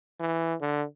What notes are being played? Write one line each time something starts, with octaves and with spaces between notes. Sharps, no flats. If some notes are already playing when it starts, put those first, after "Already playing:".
E3
D3